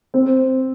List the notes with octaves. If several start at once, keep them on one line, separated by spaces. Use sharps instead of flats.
C4